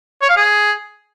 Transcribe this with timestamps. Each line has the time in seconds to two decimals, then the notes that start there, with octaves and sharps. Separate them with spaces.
0.21 C#5
0.29 F5
0.36 G#4